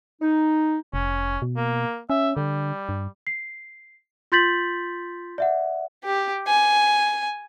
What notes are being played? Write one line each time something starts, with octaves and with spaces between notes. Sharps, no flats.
D#4
F1 C#4
B2
A#3
C#4 E5
D3 G3
G2
C7
F4 C6 G6 A6 B6 F#7
D5 E5 F#5
G4
G#5